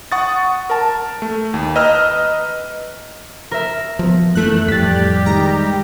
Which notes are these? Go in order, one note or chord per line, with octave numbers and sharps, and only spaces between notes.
F#5 C#6 D#6 A6
A#4 A5
A3
D#2
B4 D#5 A#5 E6 F6
A#4 E5
F3 B3
F#2 E3 A3 F#6
F2 A2 G3 G4 A6 B6
D#3 G#3 A#5